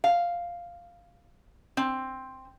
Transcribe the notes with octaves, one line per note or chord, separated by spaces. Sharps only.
F5
C4